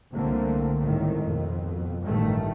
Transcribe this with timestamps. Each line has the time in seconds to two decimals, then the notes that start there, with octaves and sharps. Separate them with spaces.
0.11 C2 D3 A3 A#3 C4
0.82 G#1 A2 D#3
1.23 F2 B2
2.02 A1 G2 D#3 A3